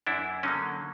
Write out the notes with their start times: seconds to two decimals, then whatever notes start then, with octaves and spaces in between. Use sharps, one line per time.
0.07 F#2 D4 E4
0.43 D3 F#3 A#3 C#4 D#4